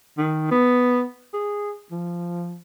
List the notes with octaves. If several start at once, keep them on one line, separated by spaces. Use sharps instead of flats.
D#3
B3
G#4
F3